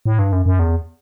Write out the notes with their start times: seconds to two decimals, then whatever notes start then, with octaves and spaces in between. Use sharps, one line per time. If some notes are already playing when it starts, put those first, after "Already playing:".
0.06 A2
0.19 G2
0.32 F#2
0.46 F#2
0.59 E2